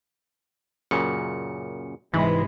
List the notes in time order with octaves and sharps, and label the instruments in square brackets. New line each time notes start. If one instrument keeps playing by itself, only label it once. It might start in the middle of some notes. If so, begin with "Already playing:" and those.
[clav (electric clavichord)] F#2 A#2 C#3 [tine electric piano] C#7
[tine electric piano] G#2 B5 [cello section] C3 G#3 [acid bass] E3